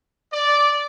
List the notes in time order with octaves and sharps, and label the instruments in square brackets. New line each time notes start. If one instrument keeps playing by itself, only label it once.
[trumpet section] D5